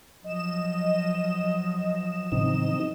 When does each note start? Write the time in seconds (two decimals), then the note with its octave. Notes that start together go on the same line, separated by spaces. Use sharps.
0.24 F3 F#3 D#5 E7
2.32 A2 C#3 E3 C4 D#4